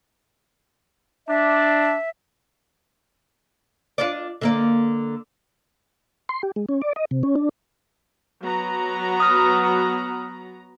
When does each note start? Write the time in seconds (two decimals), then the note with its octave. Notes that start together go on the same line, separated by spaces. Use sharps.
1.28 D4 E5
3.98 D4 F4 D5
4.41 D3 A#3 D5
6.29 C6
6.43 G4
6.56 G#3
6.69 C#4
6.82 D5
6.96 D#5
7.11 C3
7.23 C#4
7.36 D4
8.40 F#3 B3 A#5
9.20 D#6 F6